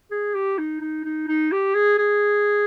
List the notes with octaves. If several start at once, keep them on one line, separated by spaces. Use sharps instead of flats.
G#4
G4
D#4
D#4
D#4
D#4
G4
G#4
G#4